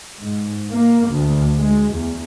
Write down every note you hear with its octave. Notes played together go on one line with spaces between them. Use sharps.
G#2
A#3
D2
G#3
E2